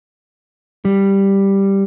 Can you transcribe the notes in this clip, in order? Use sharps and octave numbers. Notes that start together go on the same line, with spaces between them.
G3